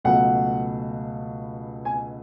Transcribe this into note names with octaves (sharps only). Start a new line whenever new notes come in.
C#2 B2 F#3 A3 F#5
G#5